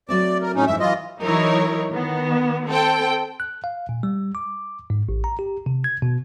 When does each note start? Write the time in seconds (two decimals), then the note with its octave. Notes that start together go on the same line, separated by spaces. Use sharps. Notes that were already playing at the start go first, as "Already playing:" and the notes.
0.09 F#3 A3 C4 D5
0.42 A#4
0.55 A2 C#4 D#4
0.67 F2 G#2 E3 E5
0.80 E3 F#3 F4 D#5
1.20 E3 F#3 D#4 E4 A#4 C#5
1.92 D#3 B3
2.68 C4 A4 G5
3.40 F#6
3.64 F5
3.89 A#2
4.03 G3
4.35 D6
4.90 G#2
5.09 A1
5.24 A#5
5.39 G4
5.66 C3
5.84 G#6
6.02 B2